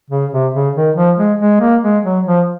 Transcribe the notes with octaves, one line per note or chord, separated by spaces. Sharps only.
C#3
C3
C#3
D#3
F3
G#3
G#3
A#3
G#3
F#3
F3